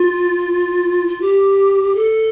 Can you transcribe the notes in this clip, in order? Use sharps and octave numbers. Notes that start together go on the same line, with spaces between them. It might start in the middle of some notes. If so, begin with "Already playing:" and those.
Already playing: F4
F4
G4
A4